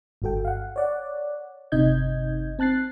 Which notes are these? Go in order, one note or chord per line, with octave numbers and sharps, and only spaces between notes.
G1 G2 F#4 A4 G5
F5 F#5
C#5 D5 F#5
G1 C3 D#4 D#5 G6 G#6
C4 A5 F#6 A6 C7